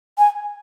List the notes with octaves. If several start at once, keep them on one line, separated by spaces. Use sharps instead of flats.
G#5